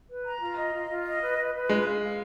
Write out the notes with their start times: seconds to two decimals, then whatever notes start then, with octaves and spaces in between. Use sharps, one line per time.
0.09 B4
0.24 A#5
0.41 F4
0.57 D#5
0.73 F4
0.89 F4
1.05 D#5
1.21 B4
1.37 B4
1.53 B4
1.69 G#3 F4
1.86 F5
2.02 F5